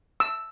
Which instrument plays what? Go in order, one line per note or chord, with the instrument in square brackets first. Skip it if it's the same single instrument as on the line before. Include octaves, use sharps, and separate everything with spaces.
[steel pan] E6